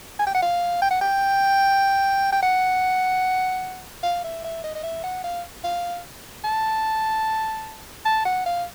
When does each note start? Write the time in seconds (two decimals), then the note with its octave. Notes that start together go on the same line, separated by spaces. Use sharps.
0.20 G#5
0.27 G5
0.35 F#5
0.42 F5
0.82 G5
0.91 F#5
1.01 G5
2.33 G5
2.43 F#5
4.03 F5
4.24 E5
4.44 E5
4.64 D#5
4.76 D#5
4.83 E5
5.04 F#5
5.24 F5
5.64 F5
6.44 A5
8.06 A5
8.25 F#5
8.46 F5